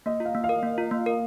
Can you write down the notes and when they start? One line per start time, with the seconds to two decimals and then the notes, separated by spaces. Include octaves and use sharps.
0.06 A#3 D#5
0.20 F4
0.25 F5
0.35 A#3
0.44 F5
0.49 A#4
0.63 A#3
0.78 F4
0.91 A#3
1.06 A#4